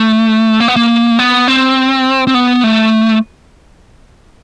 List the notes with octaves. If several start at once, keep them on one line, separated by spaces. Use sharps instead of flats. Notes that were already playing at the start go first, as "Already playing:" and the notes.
Already playing: A3
A#3
B3
A#3
B3
C4
C4
B3
A3